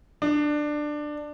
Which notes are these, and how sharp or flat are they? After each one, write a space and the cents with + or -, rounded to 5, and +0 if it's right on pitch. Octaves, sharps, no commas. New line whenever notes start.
D4 +15